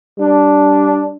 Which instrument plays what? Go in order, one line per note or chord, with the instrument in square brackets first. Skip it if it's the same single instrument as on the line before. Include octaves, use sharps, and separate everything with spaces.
[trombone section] G3 D4